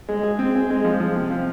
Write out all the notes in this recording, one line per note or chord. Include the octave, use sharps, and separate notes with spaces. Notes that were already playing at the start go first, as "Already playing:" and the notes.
G#3
G#4
C4
G#4
G#3
F3
F3
C3
F3